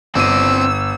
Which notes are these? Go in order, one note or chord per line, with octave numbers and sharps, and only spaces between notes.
G1 C4 D5 E6 D#7